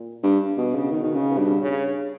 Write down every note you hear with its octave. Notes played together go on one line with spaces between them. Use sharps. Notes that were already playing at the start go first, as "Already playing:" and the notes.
Already playing: A#2
G2
B2
C#3
B2 D#3
D#3
C#3
B2
G2
C#3